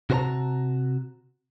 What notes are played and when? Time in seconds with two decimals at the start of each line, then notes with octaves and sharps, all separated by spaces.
0.10 C3 F#4 A#4 C5 A5 A#5